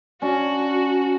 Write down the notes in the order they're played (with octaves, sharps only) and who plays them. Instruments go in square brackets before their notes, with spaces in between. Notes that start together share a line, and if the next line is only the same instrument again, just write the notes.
[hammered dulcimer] C#4 D4 [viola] F#4